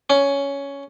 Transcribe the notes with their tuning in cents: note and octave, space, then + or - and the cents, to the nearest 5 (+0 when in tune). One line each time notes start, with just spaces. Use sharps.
C#4 +10